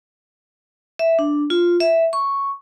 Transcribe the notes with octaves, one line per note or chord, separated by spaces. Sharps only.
E5
D4
F4
E5
C#6